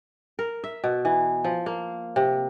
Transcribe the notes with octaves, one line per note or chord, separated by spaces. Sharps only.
A#4
E5
B2
E3
F3
A#3
C3